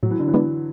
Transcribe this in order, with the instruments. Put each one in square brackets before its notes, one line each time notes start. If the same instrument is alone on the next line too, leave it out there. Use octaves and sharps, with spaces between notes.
[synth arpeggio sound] A2 [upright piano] F#3
[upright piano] E3
D3
E3
[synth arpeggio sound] G#3 B3 D4